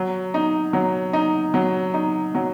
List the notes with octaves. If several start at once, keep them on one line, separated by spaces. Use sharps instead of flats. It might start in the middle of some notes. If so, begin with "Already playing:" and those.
Already playing: F#3
D#4
F#3
D#4
F#3
D#4
F#3